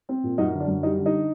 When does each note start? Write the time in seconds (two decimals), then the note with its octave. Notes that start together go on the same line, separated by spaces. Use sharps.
0.09 C4
0.23 A#2
0.38 F#2 D#4
0.53 D3
0.60 D4
0.68 F#2
0.83 G3 D#4
0.98 D3
1.06 D#4